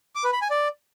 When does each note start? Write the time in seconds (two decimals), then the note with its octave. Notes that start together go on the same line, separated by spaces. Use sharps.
0.15 D6
0.24 B4
0.33 B5
0.41 G#5
0.50 D5